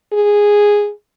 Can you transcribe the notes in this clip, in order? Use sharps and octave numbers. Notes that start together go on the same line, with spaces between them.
G#4